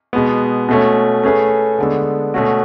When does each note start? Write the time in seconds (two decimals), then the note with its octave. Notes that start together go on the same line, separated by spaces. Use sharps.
0.13 B2 G#3 B3
0.68 B2 A3 C#4
1.24 A3 C#4 G#4 B4
1.79 D3 G#3 B3 D4 A4
2.34 B2 A3 C#4 F#4